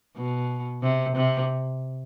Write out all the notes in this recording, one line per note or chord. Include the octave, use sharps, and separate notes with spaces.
B2
C3
C3